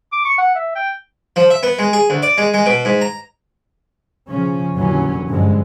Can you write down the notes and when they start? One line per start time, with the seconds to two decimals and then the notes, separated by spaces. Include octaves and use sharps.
0.13 D6
0.25 C#6
0.38 F#5
0.55 E5
0.76 G5
1.36 F3
1.50 E5
1.63 B3
1.79 G#3
1.93 G#4
2.10 D2
2.23 D5
2.38 G#3
2.54 G#3
2.66 B2
2.85 G#2
3.01 A#5
4.28 C#3 F3 C#4
4.75 F1 A#2 D3 E3 F#3 C#4
5.28 G2 D3 F3 F#3 G#3